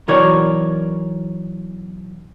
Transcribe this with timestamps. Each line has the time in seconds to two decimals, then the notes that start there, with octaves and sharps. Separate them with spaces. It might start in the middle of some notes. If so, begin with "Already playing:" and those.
0.08 B1 B2 E3 A#4 C#5 D5